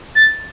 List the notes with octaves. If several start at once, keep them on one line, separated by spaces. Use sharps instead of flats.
A6